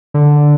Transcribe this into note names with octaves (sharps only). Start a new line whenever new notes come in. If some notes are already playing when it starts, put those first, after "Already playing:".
D3